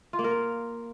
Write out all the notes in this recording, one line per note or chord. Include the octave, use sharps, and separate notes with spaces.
F4
A#3
A#4